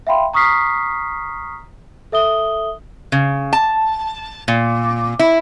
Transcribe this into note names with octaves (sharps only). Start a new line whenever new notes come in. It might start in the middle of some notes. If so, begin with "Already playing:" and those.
E5 F5 G5 B5 C6
A#5 C#6 D#6 F6 B6 C7
A4 E5 D#6 G7
C#3
A5
A#2
E4